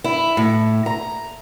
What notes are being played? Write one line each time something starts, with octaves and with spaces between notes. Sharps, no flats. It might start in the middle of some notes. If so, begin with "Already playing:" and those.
E4
A2
A#5